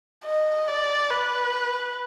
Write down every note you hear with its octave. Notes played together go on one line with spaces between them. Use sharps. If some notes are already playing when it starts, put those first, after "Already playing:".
D#5
D5
B4